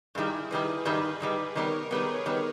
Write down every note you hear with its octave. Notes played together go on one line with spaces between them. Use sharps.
G2 D#3 G3 E4 G#4
G2 D#3 G3 G#4 B4
G2 D#3 G3 G#4 B4
G2 D#3 G3
D#3 G3 B3 A#4 C#5
D#3 G3 B3 G#4 B4
D#3 G3 B3